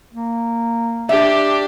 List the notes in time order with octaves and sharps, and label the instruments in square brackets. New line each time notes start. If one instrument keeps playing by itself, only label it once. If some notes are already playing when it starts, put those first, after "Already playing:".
[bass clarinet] A#3
[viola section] D4 G4 D5 [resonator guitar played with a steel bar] E5